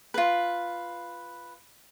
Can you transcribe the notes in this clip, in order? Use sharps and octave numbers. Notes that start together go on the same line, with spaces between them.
F4 B4